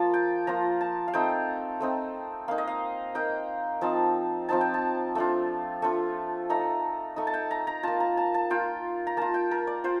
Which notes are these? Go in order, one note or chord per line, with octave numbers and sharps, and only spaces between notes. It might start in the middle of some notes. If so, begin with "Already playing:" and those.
Already playing: F3 A#3 F4 A5
G5
F3 A#3 F4 A#5
A5
F5
A3 C4 D#4 G5
A3 C4 D#4
A#3 D#4 F5
D#5
F5
A#3 D#4 G5
F3 C4 D#4 A5
F3 C4 D#4 A5
G5
A5
A3 D4 F4
A3 D4 F4
A3 D#4 A#5
A3 D#4
A5
G5
A#5
A#5
A#3 F4 A5
A#5
A5
A5
A#3 F4 G5
A#5
A#3 F4 A5
G5
A#4
D5
F4 C5